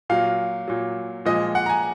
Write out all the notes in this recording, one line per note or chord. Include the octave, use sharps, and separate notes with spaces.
A#2 F#3 F5
A#2 F#3
A#2 F3 G#3 D#5
F#5
A#5
G#5